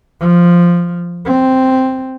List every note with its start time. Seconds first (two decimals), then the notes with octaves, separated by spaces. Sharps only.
0.21 F3
1.26 C4